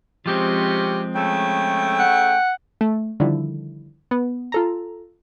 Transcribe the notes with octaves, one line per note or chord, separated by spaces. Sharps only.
C3 F3 G#3 C4 C#4 G4
C#3 A3 G5
F#5
A3
D3 D#3 F3 G3 E4
B3
F4 A4 A#5